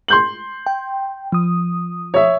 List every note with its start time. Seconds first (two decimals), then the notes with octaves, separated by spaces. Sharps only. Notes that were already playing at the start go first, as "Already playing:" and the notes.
0.08 C6 G6 F#7
0.66 G5
1.32 F3 D#6
2.14 C#5 E5